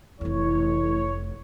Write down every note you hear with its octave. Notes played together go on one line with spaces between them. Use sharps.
F1 F2 A2 E3 C#5